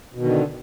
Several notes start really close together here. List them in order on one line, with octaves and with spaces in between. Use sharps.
B2 D#3 D3